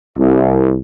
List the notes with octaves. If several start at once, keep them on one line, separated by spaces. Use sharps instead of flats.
C2